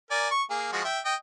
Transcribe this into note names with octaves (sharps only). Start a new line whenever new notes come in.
A#4 D5 G#5
C#6
A#3 G#4
F3 G#3 F#4
E5 G5
D#5 G5